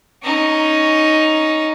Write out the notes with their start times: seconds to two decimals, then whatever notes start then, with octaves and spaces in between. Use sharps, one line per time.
0.23 C#4 D#4